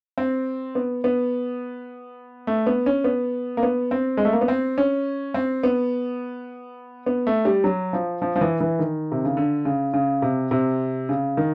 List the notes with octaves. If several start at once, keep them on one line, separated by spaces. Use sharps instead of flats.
C4
B3
B3
A3
B3
C#4
B3
A#3
B3
C4
G#3
A3
A#3
B3
C4
C#4
C4
B3
B3
A3
G3
F#3
F3
F3
F3
E3
E3
D#3
C3
C#3
D3
C#3
C#3
C3
C3
C#3
D#3